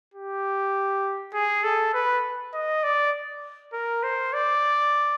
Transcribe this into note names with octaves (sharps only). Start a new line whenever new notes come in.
G4
G#4
A4
B4
D#5
D5
A#4
C5
D5